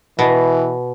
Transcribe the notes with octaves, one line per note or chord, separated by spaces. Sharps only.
B2 E3